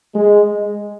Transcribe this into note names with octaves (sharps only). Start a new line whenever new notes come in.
G#3